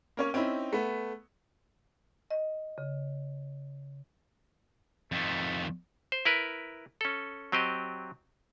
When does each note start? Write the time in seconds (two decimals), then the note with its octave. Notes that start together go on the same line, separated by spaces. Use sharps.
0.17 A#3 C#4 C#5
0.34 C4 C#4 D#4 E4
0.73 A3 B3
2.31 D#5
2.78 C#3
5.12 F2 D#3 A3
6.12 C5
6.25 E4 A#4 B4
7.01 C#4 A4
7.52 F#3 C4 G4 D#5